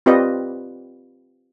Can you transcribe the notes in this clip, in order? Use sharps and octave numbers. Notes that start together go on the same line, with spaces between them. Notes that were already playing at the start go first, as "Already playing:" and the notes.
C4 F4 G4 B4 D5 D#5